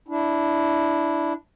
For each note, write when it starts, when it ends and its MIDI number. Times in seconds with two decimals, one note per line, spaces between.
0.08 1.33 62
0.08 1.33 64